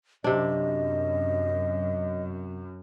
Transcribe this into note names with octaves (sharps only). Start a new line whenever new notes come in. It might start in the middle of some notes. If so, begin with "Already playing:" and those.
F#2 C3 D4 D#5